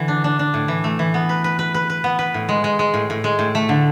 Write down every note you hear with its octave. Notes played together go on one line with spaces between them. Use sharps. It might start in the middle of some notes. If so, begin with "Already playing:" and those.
Already playing: D3 E3
D4
D4
D4
A2
E3
A3
E3
B3
B4
B4
B4
B4
B4
B3
B4
A2
G#3
G#3
G#3
A2
A2
G#3
A2
A3
D3